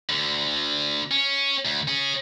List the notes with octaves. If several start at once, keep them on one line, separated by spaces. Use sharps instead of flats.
D2 D3
C#4
D2
C#4 G#4